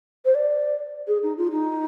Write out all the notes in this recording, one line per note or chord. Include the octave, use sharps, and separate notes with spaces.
C5
D5
G#4
D#4
F4
D#4